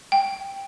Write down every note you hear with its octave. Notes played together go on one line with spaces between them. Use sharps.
G5